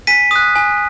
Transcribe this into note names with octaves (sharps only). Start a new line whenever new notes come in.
G#5 B6 D#7
D#6 F#6
G#5